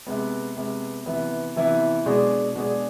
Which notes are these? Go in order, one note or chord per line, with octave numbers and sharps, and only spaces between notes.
C3 G#3 B3
C3 G#3 B3
C3 E3 B3 E4
C3 E3 B3 E4
B2 G#3 D4 G#4
B2 G#3 D4 G#4